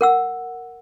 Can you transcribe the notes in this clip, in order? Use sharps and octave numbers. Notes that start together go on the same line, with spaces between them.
A#4 F#5 E6